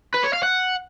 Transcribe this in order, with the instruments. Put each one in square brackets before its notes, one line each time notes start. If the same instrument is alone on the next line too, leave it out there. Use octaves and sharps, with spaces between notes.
[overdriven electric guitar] B4
C#5
F5
F#5